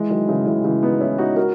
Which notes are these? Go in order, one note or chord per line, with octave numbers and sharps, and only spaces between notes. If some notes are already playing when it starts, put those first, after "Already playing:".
Already playing: E3 G#3
D#3 F#3
C#3 E3
C#3 E3
C#3 E3
B3 D#4
C#4 E4
D#4 F#4
F#4 A#4